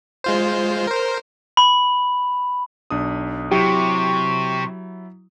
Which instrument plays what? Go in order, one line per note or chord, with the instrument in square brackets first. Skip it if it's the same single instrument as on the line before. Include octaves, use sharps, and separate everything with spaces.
[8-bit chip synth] G#3 F4 C5
A#4 C5
[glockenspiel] B5
[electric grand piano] B1 D4 D#6
[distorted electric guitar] C3 [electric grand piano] F#3 E4 [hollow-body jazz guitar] G4 [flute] C#6